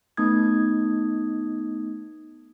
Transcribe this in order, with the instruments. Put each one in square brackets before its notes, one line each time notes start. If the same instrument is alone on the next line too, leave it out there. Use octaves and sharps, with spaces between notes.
[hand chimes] A3 B3 D#4 D#6 G#6